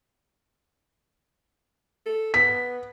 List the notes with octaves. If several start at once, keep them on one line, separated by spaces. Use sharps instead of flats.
A4
B3 B6